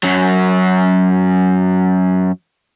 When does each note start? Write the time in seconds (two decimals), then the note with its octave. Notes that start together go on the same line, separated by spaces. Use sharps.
0.03 F#2 F#3